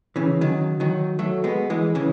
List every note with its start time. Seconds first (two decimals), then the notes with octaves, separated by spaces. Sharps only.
0.16 C#3 E3
0.41 D#3 F#3
0.80 D#3 F#3
1.19 F#3 A3
1.44 G#3 B3
1.70 E3 G#3
1.95 C#3 E3